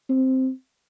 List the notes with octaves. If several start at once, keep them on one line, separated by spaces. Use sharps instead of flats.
C4